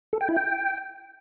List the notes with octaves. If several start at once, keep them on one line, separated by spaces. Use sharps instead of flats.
A4
G5
E4
G5